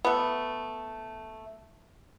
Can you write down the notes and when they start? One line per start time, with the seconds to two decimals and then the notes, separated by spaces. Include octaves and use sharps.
0.05 A3 B3